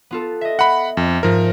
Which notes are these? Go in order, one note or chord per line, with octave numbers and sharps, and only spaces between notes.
B3 F4 A4
D#5 E5
F#5 B5
F2
G#2 F3 A#4 C5